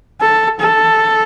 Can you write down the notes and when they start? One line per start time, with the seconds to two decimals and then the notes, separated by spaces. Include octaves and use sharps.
0.21 A4
0.60 A4